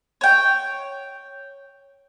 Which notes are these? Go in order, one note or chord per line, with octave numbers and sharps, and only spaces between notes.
C#5 G5